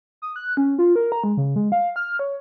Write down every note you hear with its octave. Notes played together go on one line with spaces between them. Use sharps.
D#6
F#6
C#4
F4
A#4
A#5
G#3
C#3
G#3
F5
F6
C#5